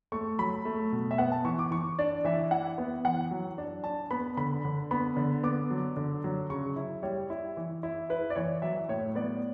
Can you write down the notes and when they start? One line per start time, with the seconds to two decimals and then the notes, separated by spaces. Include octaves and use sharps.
0.12 A3 C#6
0.39 F#3 B5
0.65 A3
0.92 B2
1.11 E5
1.18 B3 F#5
1.32 A5
1.44 E3 C#6
1.59 D6
1.71 E3 C#6
1.99 D4 D5
2.25 E3 E5
2.51 E4 F#5
2.78 B3
3.04 E3 F#5
3.31 F#3
3.58 D4
3.84 D4 A5
4.11 B3 B5
4.37 D3 B5
4.65 D3
4.91 B3 B5
5.17 D3
5.43 B3 D6
5.70 F#3
5.96 D3
6.24 F#3
6.50 C#3 C#6
6.76 E4
7.03 G3 C#5
7.30 E4
7.57 E3
7.83 E4
8.09 E4 B4
8.30 D5
8.35 E3 C#5
8.62 F#3 E5
8.89 A2 C#5
9.15 B3 D5